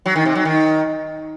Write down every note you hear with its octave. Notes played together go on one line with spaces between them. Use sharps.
F#3
D#3
C3
F#3
D#3